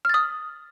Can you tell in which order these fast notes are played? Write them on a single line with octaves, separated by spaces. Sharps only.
F6 A6 D#6